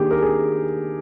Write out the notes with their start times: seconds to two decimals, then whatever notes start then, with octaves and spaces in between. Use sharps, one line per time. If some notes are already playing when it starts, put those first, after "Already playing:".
Already playing: D#3 A#3 D4 G4 G#4
0.11 A#4
0.22 G#4